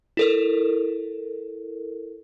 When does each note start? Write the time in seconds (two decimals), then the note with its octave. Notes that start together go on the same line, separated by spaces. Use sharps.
0.17 E4 A4 A#4